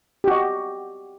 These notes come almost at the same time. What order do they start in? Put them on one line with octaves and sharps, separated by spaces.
G4 F#4 D#5